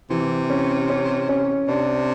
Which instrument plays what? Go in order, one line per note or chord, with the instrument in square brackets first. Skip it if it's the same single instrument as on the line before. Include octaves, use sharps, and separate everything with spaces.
[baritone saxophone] C3 [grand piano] E3
[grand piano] C#4
C#4
C#4
[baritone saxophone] C3 [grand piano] D4